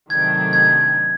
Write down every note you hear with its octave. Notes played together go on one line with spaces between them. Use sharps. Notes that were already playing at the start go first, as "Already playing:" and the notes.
C3 D#3 F#3 A3 D4 G#6
G#6